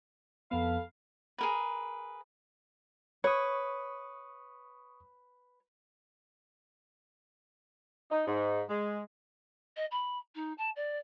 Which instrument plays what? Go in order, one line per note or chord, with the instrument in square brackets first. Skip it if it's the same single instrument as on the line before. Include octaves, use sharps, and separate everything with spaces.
[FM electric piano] F2 B3 [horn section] A4 F5 B5
[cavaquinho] G#4 A#4 B4
[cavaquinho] B4 [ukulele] C#5 [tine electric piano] C#6 D#6
[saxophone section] D#4
G#2
G#3
[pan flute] D#5
B5
D#4
A5
D5